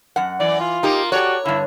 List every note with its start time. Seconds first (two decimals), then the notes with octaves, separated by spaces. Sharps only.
0.16 F#2 F#5
0.40 E3 D5
0.60 F4
0.83 A#3 D#4 G4 D#5
1.12 F#4 G4 A4 C#5 D5
1.45 G2 D3 E4